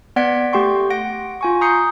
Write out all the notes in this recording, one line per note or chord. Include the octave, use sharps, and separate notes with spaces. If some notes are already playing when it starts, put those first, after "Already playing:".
B3 D5 F#5 G#6 B6 D7
A3 G4 G5 C6 C#6
F#5 A#6 D7
F4 G#5 C#6
A#5 D#6 G6 C7 C#7